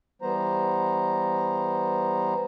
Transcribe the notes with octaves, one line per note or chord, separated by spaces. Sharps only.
E3 G3 B3 C5 A#5